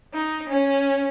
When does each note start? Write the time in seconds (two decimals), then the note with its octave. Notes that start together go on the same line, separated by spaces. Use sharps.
0.12 D#4
0.47 C#4